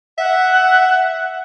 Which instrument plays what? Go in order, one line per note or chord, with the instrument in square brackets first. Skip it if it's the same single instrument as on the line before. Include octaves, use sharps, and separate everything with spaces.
[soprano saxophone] E5 [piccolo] F#5